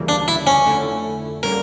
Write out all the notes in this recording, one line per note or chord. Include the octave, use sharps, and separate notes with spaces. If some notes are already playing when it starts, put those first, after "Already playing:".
Already playing: D2 C#3 E3 G3 A#3
D4
E4
C#4
F2 D3 A3 E4
D3 G3 A#3 C#4 A#4